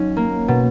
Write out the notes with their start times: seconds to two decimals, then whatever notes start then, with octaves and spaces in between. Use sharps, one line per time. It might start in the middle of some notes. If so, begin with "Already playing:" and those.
Already playing: F#3 C#4 D#4
0.17 A#3
0.48 B2